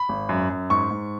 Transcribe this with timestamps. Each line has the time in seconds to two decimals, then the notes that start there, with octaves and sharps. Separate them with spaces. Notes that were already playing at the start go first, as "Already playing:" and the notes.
Already playing: B5
0.09 G#1
0.29 F#2
0.50 F#2
0.70 G#2 C#6
0.91 G#2